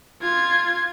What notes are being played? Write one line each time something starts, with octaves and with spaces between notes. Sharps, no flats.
F4 G#6